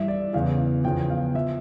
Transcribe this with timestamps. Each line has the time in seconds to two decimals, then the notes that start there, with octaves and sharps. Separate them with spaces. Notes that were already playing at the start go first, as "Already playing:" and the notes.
Already playing: G2 E3 E5
0.08 D5
0.33 E2 C#3 E3 F5
0.84 E2 C#3 F3 G5
1.10 F5
1.35 F3 E5